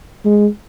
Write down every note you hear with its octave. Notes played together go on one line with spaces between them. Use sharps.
G#3